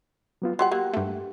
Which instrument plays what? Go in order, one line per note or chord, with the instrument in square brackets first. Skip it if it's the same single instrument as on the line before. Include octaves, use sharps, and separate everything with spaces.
[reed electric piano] F#3 B3 F4
[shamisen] F#3 G3 F#5 [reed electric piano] C6
[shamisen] F#3 A#3 [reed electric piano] G4 F#5
[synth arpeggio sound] G2 A3